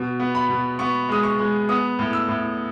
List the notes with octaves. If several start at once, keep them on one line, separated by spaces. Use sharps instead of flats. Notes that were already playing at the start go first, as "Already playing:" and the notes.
Already playing: B2
B3
B5
B2
B3 C#6
G#3 D#6
C#6
G#3
B3 D#6
A2
E6
A2